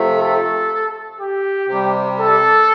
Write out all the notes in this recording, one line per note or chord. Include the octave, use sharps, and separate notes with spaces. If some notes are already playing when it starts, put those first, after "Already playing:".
Already playing: C3 F3 A3
A4
G4
C3 G3
A4